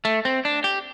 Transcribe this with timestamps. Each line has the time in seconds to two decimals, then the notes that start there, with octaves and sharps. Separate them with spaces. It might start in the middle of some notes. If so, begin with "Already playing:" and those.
0.05 A3
0.25 C4
0.45 D4
0.64 G4